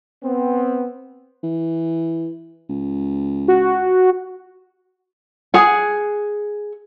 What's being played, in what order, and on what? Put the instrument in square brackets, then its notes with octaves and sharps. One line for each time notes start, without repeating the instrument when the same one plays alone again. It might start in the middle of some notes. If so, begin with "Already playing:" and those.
[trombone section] B3 C4
[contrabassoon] E3
C#2
[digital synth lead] F#4
[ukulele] G#4 F#5